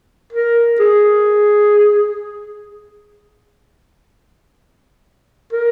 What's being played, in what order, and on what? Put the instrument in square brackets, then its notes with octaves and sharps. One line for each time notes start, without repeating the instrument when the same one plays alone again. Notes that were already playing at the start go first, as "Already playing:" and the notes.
[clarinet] A#4
G#4
A#4